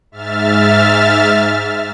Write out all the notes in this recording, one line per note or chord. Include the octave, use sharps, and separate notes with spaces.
G#2 E5 F6 A6